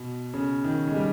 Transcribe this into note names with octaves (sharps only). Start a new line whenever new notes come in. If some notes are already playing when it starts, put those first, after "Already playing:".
Already playing: B2
C#3
D#3
G#3
G3